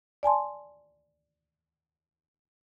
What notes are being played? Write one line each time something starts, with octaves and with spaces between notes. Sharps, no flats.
D5 G#5 A5 C6